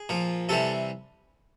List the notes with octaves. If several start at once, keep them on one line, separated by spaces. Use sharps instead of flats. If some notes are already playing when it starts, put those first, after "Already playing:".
Already playing: G#4
A#2 F3
C3 E3 G3 A4